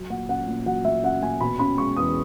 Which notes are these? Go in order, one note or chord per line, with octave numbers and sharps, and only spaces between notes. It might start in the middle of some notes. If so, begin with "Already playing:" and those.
Already playing: F#3
A#2 F#5
C#4 F#5
A#2
F#3 F#5
A#2 E5
C#4 F#5
A#2 G#5
B2 B5
C#4 B5
G#3 C#6
E2 D#6